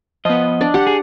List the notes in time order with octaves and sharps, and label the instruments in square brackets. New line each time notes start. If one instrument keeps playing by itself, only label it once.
[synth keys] F3 B3 [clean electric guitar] D#5
[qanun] D4 D5
[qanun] G4 [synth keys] F#5
[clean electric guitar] G#4